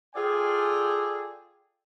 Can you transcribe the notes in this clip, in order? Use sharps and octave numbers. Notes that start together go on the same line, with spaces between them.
F4 G#4 A4 D5 G5 G#5